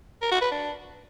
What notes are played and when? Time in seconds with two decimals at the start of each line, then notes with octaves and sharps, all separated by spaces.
0.22 A#4
0.32 F#4
0.41 B4
0.51 D4